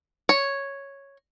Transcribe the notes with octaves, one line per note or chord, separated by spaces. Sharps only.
C#5